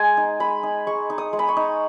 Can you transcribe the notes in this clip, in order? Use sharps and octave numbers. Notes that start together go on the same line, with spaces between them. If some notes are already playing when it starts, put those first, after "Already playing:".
Already playing: G#3 G#5
D#4
G#3 B5
D#4
G#3 C#6
D#4
D#6
G#3
B5
C#6
D#4